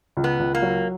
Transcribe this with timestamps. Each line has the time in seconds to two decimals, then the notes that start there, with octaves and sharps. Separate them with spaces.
0.17 C#2
0.24 B3
0.40 C#2
0.55 A#3
0.62 F#3